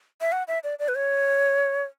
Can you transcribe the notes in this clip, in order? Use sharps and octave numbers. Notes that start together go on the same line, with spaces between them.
E5
F#5
E5
D5
D5
B4
C#5